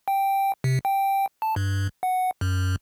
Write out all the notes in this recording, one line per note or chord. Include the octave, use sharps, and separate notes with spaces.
G5
C3
G5
A5
G2
F#5
F#2